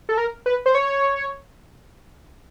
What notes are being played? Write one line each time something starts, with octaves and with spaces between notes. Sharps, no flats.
A4
A#4
B4
C5
C#5